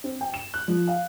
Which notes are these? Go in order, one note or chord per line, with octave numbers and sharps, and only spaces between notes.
C4
G5
E7
F#6
F3
F5